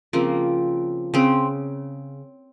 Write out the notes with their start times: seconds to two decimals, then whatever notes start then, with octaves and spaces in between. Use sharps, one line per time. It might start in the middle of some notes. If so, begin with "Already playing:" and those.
0.13 C#3 F3 A#3 C4
1.14 C#3 C4